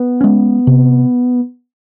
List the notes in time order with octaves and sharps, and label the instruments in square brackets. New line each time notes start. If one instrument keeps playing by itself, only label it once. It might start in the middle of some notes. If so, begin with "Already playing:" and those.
Already playing: [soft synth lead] B3
[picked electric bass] G#3 C#4
C3